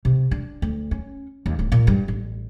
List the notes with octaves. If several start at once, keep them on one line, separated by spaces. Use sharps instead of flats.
C3
D4
D2
C#4
D#2
D1
A#2
G2
A1